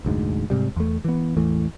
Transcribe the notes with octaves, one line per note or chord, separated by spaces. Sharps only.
F1 D2 G#2
G#2 C3 G3
E2 A3
E3 B3
A1 E2 E3 A3